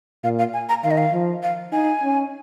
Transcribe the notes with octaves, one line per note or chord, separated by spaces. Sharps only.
A#2 F5
F5
G#5
A#5
D#3 F5
D#5
F5
F3
F5
D#4 G#5
C#4